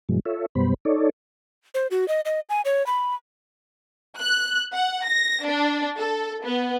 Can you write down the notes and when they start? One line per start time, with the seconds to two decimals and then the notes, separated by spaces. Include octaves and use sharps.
0.09 G2 B2 E3 F#3 G#3
0.25 F4 A4 C#5 E5
0.55 F#2 B2 G3 B3 C5 B5
0.85 D#4 A4 C#5 D5
1.74 C5
1.91 F#4
2.08 D#5
2.25 D#5
2.49 G#5
2.65 C#5
2.86 B5
4.18 F#6
4.73 F#5
5.05 A#6
5.44 D4
5.97 A4
6.44 B3